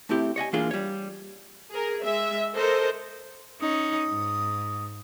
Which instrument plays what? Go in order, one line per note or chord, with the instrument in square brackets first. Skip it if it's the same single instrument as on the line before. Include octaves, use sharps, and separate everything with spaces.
[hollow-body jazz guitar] A3 C4 E4 G4
C#5 D#5 F#5 G#5
E3 A#3 D4 F4 G#4 A#4
G3 C#5
[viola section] G#4 A#4
G#3 E5
A4 A#4 C5 D#5
[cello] C#4 D#4 [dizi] D#6
[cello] G#2